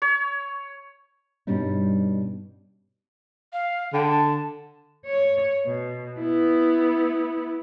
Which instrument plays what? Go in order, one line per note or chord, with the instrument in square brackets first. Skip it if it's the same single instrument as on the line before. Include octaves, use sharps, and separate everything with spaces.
[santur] C#5
[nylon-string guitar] G2 B2 G3 C#4 D#4
[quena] F5
[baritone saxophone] D3 [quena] G5
[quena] A5
[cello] C#5
B2
B3 E4